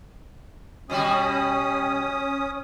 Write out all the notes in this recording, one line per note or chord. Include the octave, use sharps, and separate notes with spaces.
B2 G3 C#4 F#4 D#6